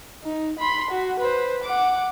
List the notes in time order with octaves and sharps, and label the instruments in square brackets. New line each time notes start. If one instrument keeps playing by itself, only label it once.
[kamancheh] D#4
B5 C6
F#4
B4 C5
F#5 D6